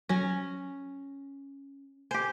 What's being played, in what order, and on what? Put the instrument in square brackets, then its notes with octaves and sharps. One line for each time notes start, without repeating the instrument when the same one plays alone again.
[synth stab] F#3 A#6 [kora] C#4
[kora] G4 C5 [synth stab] G#5